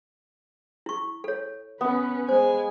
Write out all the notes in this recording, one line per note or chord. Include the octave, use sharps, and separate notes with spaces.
E4 C#6
A4 C#5
B3 C#4 B4
G#3 C5 G#5